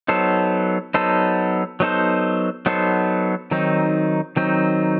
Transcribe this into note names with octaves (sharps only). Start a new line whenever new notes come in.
F#3 B3 D#4 A4 C5
F#3 B3 D#4 A4 C5
F#3 B3 D#4 A4 C5
F#3 B3 D#4 A4 C5
D#3 F#3 C4 D#4
D#3 F#3 C4 D#4